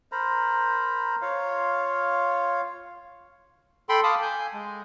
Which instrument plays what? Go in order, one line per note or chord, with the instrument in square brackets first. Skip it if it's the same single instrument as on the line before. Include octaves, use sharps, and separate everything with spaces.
[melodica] A#4 C5 A#5 B5
F4 C#5 F5
[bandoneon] A4 G5 B5 C6
F5 A5 B5 D6 D#6
G#5 G6
G#3